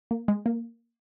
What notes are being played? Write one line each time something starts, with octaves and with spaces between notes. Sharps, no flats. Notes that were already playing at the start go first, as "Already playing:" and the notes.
A#3
G#3
A#3